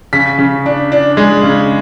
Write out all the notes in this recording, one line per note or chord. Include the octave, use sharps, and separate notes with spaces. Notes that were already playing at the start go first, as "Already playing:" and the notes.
C#3 B6
C#3
D4
D4
G#3
C#3